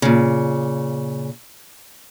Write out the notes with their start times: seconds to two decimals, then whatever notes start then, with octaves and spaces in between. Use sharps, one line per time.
0.02 A#2 C#3